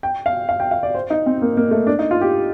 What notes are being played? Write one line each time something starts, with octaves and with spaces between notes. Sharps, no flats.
G5
F5
F5
G5
F5
D5
C5
D#4
C4
A#3
A#3
A3
D4
D#4
F4
G4